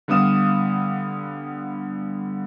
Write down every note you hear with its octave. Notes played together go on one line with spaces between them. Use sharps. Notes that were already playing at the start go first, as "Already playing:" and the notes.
D3 G3 B3 F5 D#6 E7